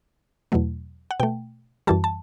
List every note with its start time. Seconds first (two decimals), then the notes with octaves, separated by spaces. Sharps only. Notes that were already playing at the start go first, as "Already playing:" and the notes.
0.52 E2 B2 F#3 A3
1.11 F#5
1.20 B2 A3 G5
1.87 F#2 E3 G3 A5
2.04 A5